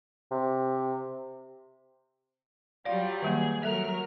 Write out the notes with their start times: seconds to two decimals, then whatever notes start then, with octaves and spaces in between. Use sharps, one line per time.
0.31 C3
2.85 F#3 G3 F4 D5 F5
3.22 D#3 G3 A#3 G#4
3.63 F#3 A4 A#4 E5 F6